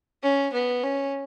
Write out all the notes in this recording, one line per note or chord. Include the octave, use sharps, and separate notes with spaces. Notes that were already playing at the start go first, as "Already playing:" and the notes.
C#4
B3
C#4